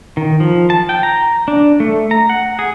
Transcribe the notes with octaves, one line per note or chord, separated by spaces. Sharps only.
D#3
F3
A5
G5
A#5
D4
A3
A#5
F#5
G#4